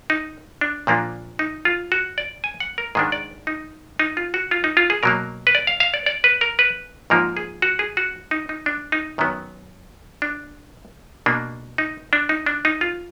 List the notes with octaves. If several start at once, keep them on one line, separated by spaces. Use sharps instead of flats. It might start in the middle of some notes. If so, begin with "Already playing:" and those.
D#4
D4
A#2 F3 A#3 D4
D#4
F4
F#4
D5
G#5
F#5
A#4
G#2 D#3 G#3 D4 G#4
D5
D#4
D#4
F4
F#4
F4
D#4
F4
G#4
B2 F#3 A#3 A#4
B4
D5
F5
F5
D5
D5
B4
A#4
B4
G#2 F3 A#3 A#4
G#4
F#4
G#4
F#4
D#4
D#4
D4
D#4
F#2 D#3 F#3 B3
D4
B2 A#3 D4
D#4
D4
D#4
D4
D#4
F4